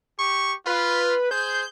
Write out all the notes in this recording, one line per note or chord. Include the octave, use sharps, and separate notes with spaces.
G4 C#6
F4 B4
G#4 C5 G6